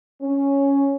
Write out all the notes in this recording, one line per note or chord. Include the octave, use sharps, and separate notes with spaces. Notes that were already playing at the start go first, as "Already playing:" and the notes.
C#4